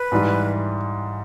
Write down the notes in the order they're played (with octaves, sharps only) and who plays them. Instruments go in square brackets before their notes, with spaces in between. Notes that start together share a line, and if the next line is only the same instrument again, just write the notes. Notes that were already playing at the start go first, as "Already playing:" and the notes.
Already playing: [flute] B4
[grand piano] G#2 E3 G3